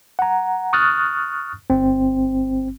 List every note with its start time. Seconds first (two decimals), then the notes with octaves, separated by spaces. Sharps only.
0.19 F#5 A#5
0.73 C#6 D#6 F6 F#6 A6
1.70 G1 C4